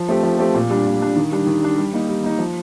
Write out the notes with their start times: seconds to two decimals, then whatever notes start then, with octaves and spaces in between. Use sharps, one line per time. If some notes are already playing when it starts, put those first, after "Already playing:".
Already playing: F3
0.09 A3 C4 G4
0.23 F3
0.39 A3 C4 G4
0.55 A#2
0.70 G3 D4
0.86 A#2
1.01 G3 D4
1.16 D#3
1.32 G3 D4
1.46 D#3
1.62 G3 D4
1.78 G3
1.93 A#3 D#4
2.09 G3
2.24 A#3 D#4
2.38 F3